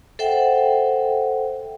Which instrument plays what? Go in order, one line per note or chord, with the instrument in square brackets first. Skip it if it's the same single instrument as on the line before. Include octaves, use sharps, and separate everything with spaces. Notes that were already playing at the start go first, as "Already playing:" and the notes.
[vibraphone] A4 C5 E5 F#5 G5